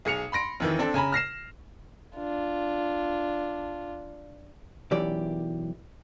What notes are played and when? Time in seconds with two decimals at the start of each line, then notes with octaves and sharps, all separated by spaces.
0.05 B1 G#4 C#7 F7
0.32 B5 C6 A#6 D7
0.60 F2 D#3 E3
0.79 C4 D4 A4
0.94 C#3 G#5 A#5 B5
1.12 F6 A#6 C7 E7
2.16 D4 F4
4.91 B1 F#2 E3 G4 D5